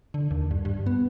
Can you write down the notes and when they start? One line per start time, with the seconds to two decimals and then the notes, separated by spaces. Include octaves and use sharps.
0.14 D3
0.31 D#2
0.51 G2
0.65 G2
0.86 B3